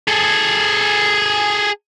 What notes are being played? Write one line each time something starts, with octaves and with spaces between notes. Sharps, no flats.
G#4 A4